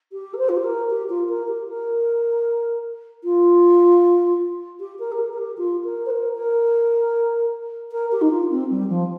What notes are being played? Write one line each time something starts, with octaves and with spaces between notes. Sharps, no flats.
G4
A#4
C5
F4
G4
A#4
G4
F4
A#4
G4
A#4
F4
G4
A#4
G4
A#4
A#4
G4
F4
A#4
C5
A#4
A#4
A#4
G4
D#4
F4
C4
G3
F3